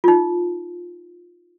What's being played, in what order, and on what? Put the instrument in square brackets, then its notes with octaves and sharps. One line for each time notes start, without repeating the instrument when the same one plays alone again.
[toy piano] D#4 F4